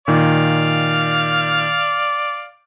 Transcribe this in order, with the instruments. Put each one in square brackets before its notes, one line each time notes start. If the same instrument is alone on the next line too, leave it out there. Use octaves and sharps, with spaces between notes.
[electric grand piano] A#2 D#3 [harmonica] D5 F5